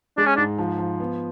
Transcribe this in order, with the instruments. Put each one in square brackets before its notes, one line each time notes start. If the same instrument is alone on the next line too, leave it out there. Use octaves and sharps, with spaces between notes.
[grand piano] G#3 [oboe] D4
[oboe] C#4
[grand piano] G#2 [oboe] D4
[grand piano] F3
F3
B3